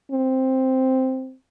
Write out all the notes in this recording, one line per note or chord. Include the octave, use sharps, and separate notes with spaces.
C4